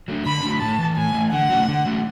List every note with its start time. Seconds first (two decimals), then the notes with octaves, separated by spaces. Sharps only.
0.08 F#3 A3 D4
0.26 D3 B5
0.43 F#3 A3 D4
0.61 A2 A5
0.79 E3 A3
0.96 A2 G#5
1.14 E3 A3
1.32 D3 F#5
1.49 F#3 A3 C#4
1.68 D3
1.86 F#3 A3 C#4